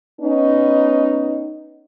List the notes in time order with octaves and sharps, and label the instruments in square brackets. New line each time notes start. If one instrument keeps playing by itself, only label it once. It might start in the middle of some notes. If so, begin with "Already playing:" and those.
[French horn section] B3 C#4 D#4